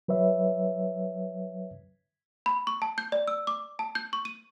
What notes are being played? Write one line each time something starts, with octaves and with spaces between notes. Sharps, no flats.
F#3 B4 C#5 E5
B5
C#6
A5
G6
D5
E6
D6
A5
G6
C#6
D#7